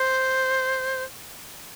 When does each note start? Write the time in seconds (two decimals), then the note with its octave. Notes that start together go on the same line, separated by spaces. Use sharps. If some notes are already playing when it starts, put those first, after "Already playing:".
Already playing: C5